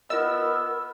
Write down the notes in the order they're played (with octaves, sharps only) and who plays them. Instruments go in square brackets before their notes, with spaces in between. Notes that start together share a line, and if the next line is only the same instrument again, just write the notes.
[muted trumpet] B3 [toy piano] F4 D#5 [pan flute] A#4 [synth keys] E6